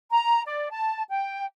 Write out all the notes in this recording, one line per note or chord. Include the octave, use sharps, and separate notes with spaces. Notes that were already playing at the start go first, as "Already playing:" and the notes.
A#5
D5
A5
G5